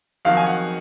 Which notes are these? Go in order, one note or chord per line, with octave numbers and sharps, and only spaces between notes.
F2 D#3 F#3 F5
G#5
F#5